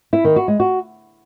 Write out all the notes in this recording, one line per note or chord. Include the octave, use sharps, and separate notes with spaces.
E4
D#3
F#4
G#3
F#4